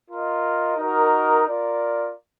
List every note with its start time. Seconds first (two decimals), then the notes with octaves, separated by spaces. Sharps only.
0.09 F4 A#4 D#5
0.76 D#4 F#4 A#4 D#5
1.44 F4 A#4 D5